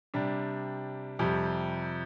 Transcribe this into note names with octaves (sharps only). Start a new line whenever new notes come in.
C3 G3 D4
F2 C3 G3